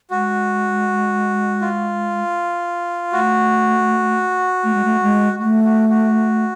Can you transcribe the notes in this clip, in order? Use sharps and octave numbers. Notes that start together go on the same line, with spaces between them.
G#3 F#4
F4
A3 F#4
A3
G#3
A3
G#3
A3 F#4
F#4
F#4